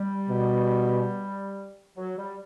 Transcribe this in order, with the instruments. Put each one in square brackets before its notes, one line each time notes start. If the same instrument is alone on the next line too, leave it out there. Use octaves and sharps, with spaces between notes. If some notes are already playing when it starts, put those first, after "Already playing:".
Already playing: [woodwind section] G3
[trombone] B2
[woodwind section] F#3
G3